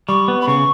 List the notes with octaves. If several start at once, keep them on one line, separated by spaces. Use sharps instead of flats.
G3 C#6
B3
B5
C#3 C#6